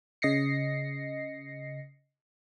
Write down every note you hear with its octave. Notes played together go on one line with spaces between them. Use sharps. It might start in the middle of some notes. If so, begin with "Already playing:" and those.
C#3 D#5 A#6 C7 C#7